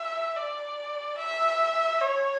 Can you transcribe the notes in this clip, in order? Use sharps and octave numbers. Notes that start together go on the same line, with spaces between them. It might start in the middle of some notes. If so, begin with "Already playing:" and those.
Already playing: E5
D5
E5
C#5